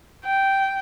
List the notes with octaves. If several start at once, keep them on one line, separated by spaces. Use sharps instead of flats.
G5